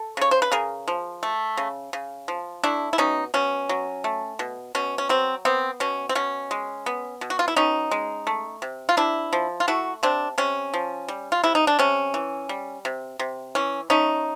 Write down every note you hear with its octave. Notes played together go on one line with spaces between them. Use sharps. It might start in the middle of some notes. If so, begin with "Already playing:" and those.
Already playing: A4
C#3 C#5
C5
B4
C#3 G#4 A#4
F3
A3
C#3
C#3
F3
A3 D4 E4
E4
B2 C#4 D#4
B2 C#4
F#3
A3
B2
B2 C#4
C#4
F#3 C4
B3 C4
B2 C#4
C4
B2 C#4
G#3
B3
B2
F#4
F4
E4
B2 C#4 D#4
G#3
A3
C3
F4
C3 D4 E4
F3
F4
A3 E4 F#4
C3 C4 D4
C3 C#4
F3
G3
F4
C3 E4
D#4
D4
C3 C#4
E3
G3
C3
C3
E3 C#4
A3 C#4 D#4